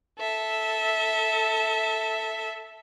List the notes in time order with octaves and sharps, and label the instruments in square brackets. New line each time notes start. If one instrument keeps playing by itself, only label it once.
[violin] A4 E5